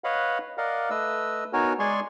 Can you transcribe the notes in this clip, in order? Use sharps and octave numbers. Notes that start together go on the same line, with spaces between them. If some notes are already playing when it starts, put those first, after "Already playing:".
B4 C#5 D#5 F5 F#5 B5
A#4 D5 D#5 F5 F#5
A3 B4 D#5 E6
B3 D#4 F#4 A#4 C#5 G#5
G#3 G#4 D5 G#5 C6 C#6